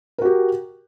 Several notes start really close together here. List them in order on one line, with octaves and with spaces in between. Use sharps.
A#4 F#4 G4